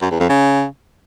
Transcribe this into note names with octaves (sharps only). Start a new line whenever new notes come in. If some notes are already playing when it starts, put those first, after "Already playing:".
F#2
E2
F2
C#3